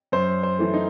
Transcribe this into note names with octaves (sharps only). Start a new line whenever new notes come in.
F#2 C5
C5
E3 A3
D#4